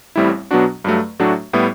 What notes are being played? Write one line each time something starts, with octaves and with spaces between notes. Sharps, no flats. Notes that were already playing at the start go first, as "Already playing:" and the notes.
A1 A2 G3 C4 E4
B2 F#3 B3 D4 F#4
G2 F#3 A3
A2 F#3 A3 D4 F#4
A2 G3 B3 E4